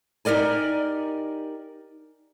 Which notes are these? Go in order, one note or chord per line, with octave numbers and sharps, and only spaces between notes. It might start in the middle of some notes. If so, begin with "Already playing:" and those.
D#4 G4 A#4 D5 G#5